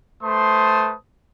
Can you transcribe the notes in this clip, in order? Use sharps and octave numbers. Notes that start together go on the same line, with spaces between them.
A3 B4 C5 A5 C6 D#6